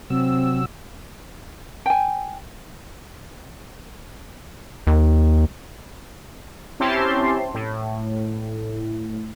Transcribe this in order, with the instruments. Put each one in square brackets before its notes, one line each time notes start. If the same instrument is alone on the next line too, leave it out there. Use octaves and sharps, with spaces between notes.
[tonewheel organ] C3 F#3 E6 [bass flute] C4
[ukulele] G5 G#5
[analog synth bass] D#2
[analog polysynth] C4 C#4 E4 G4 A5 C6
A2